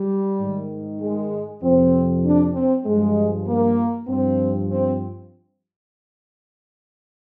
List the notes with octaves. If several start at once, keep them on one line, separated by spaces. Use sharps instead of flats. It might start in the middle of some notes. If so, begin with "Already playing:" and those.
Already playing: G3
G#2 D#3
G#3
F2 C3 F3 C4
D4
C4
G2 F3 G#3
A#3
G2 F3 C4
C4